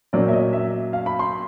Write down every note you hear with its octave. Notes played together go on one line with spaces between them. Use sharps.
A#2 F#3 A#3 C#4 D5
E5
D#5
E5
F5
B5
C6